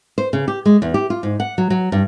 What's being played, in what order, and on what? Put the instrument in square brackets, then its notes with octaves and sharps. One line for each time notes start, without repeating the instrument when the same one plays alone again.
[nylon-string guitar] C5
C#3
G4
G#3
E2
G4
F4
G#2
F#5
F#3
F#3
G2